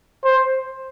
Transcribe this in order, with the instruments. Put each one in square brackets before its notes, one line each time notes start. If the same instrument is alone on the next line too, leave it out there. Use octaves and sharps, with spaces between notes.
[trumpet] C5